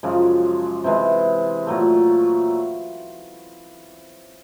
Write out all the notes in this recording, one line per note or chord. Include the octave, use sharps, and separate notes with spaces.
F#2 C#3 F3 G#3
C3 E3 G#3
A#2 F#3 A3